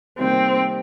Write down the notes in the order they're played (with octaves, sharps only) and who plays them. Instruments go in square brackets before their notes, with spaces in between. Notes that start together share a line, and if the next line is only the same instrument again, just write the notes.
[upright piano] C3 D#3 G3 A#3 [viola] C4